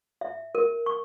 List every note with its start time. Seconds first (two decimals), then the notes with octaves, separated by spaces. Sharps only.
0.21 E5
0.55 A#4
0.86 C#6